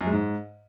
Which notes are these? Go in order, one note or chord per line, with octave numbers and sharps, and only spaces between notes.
F#2
G#3
G#2